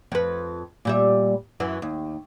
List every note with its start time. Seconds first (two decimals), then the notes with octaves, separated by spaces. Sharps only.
0.12 F2 B4
0.85 A#2 G3 E5
1.60 F#2 E3
1.82 D#2